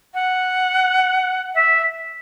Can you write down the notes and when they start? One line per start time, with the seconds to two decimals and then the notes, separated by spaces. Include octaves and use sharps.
0.14 F#5
1.55 E5